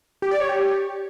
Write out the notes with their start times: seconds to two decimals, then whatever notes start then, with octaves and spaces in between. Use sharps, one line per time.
0.22 G4
0.31 D5
0.40 C#5
0.49 G4